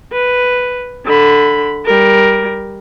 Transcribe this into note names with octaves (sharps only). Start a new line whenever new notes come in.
B4
D3 B5
G3 A#4